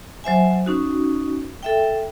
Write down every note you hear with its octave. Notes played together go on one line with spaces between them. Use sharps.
F#3 C5 E5 G#5
C#4 D#4 F#4
A4 E5 G5